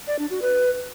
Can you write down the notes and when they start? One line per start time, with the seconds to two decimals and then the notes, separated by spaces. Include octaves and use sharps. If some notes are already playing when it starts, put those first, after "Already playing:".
0.07 D5
0.19 D4
0.30 F#4
0.42 B4